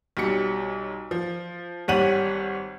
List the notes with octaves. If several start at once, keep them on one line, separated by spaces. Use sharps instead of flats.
B1 F#3 G3 C#7
F3
G#1 G3 C#5 F#5 D#7 F#7